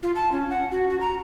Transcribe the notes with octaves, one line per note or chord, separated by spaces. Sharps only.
F4
A5
C#4
F#5
F#4
F#4
A#5